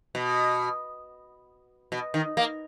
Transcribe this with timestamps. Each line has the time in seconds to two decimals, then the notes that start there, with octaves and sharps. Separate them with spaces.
0.15 B2
1.92 B2
2.14 D#3
2.37 A#3